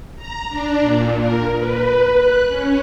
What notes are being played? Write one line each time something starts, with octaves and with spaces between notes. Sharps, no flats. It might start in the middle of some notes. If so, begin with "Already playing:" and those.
A#5
D4
A#2
A#4
B4
F#6
C#4